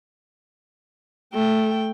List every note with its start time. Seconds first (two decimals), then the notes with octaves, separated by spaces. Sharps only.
1.34 A3 G5